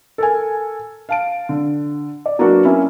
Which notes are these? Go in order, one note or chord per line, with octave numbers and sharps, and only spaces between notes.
A4 A#4 G#5
F5 A5 D7
D3
D5
F#3 A#3 B3 D4 F#4
A#3 C#4 E4